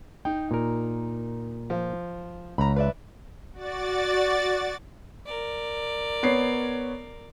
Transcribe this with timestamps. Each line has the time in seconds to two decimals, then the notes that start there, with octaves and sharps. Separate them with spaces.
0.25 D#4 G5
0.51 A#2 A#4
1.70 F3
2.58 C#2 A#5 B5
2.76 B4 D5 E5
3.53 F#4 D5 A6
5.24 A#4 D5
6.23 B3 C#5 C7